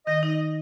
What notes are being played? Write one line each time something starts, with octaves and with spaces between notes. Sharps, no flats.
D#3 D#5
D#4 D#5